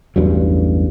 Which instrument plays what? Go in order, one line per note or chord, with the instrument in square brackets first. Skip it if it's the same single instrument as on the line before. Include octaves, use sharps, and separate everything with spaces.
[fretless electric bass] A1 E2 G2 F#3